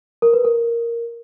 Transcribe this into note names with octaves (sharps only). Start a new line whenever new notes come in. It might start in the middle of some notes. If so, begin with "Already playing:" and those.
A#4
B4
A#4